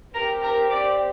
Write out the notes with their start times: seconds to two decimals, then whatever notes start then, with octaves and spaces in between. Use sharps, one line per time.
0.14 C4 G4 A#4 A#5
0.42 A#4 A#5
0.71 D5 D6